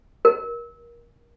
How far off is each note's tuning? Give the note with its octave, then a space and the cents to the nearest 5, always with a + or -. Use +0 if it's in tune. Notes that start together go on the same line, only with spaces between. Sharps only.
A#4 +20